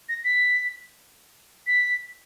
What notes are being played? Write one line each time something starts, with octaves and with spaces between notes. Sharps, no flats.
A#6
B6
B6